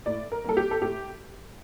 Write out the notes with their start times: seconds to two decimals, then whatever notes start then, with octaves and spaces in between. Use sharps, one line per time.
0.06 A2 D5
0.32 A#4
0.44 G3 A#3 A4
0.57 G4
0.71 A4
0.81 A2 G4